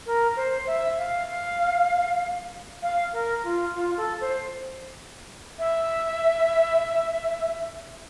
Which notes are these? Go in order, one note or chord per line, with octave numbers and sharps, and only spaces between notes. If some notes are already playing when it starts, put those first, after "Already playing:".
A#4
C5
E5
F5
F5
A#4
F4
F4
A4
C5
E5